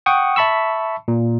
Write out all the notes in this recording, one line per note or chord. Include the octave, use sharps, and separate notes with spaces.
F#5 G5 C#6 D#6
E5 A5 B5 C#6 E6
A#2